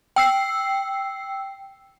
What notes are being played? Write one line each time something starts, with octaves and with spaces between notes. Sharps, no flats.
G5 E6 C7